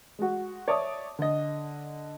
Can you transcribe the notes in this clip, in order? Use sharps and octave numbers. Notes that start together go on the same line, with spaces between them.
G#3 F#4
C#5 D5 E5 A5 D#6
D3 D#5